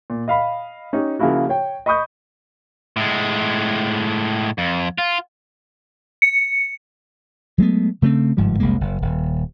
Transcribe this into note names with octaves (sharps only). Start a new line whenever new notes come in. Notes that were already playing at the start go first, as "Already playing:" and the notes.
A#2
D#5 F5 B5
C#4 D#4 G4
C#3 F3 A#3 E4 F#4
C#5 G5
D#5 B5 C#6 D#6 G6
A2 G#3
F2
F4
C#7
F#3 G#3 A3 B3
C#3 A3 B3 C4
G1 G#2 F3 G3
F1 C2 G#3 A#3
F#1
D#1